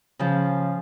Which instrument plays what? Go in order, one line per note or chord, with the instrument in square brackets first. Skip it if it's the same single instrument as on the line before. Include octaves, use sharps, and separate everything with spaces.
[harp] C#3 F3